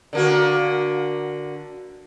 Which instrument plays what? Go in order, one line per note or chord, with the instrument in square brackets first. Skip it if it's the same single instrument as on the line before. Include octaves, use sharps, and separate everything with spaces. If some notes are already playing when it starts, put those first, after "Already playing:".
[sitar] D3 A#3 F#4